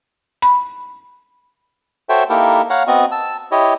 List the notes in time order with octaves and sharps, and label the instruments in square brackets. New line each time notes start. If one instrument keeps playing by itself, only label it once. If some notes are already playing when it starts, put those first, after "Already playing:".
[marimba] B5
[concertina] F#4 A4 C5 C#5 E5 G5
A#3 D#4 E4 G4 A4 A#4
C#5 F5 F#5 A#5
B3 C4 F#4 D#5 C#6
A5 E6
E4 G4 C#5 D#5